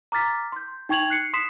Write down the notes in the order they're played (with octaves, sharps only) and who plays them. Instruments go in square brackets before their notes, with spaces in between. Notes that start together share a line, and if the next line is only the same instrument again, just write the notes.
[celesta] A#5 D6 F6 A6 B6
C6 G6
D#4 G5 C#6 G#6 F7 F#7
F#6 C7 C#7
C6 D#6 B6 C7 E7